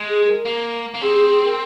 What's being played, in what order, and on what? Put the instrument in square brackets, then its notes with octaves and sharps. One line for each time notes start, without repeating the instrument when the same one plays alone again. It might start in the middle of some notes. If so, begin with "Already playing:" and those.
Already playing: [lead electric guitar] G#3
[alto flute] G#4
A#4
[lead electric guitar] A#3
A#3
[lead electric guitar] C4 [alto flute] G#4
[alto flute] G#4
G#4
A#4